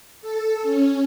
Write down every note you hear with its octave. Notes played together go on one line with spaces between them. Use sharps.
A4
C#4